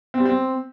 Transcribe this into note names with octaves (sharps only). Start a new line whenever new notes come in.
C4
G3
C4